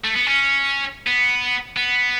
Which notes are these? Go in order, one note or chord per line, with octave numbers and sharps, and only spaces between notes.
A3
B3
C#4
B3
B3